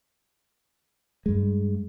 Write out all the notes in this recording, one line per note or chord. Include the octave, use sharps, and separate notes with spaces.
G2 G#3